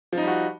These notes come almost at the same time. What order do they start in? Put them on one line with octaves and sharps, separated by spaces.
F3 D#4 G3 F#4